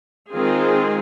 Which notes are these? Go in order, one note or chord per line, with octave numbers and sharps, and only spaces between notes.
D#3 G#3 C4 F4 G#4